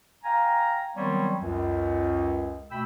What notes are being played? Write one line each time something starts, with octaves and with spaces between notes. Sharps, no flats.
F5 G5 G#5 A#5
D#3 F#3 G3 B3 C4 C#5
C#2 F#2
B2 A3 G5 B5 E6